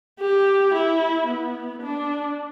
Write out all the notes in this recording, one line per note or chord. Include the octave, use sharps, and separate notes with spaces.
G4
E4
B3
D4